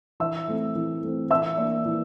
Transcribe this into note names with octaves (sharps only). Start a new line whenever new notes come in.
E3 E5 E6
A3 C4
E3
A3 C4
E3 E5 E6
A#3 D4
E3